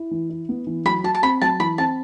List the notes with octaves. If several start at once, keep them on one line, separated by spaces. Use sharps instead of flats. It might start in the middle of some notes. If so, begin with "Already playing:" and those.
Already playing: E4
E3
E4
B3
E3
F#3 B5
F#4 A5
A5
C4 B5
F#3 A5
E3 B5
C4 A5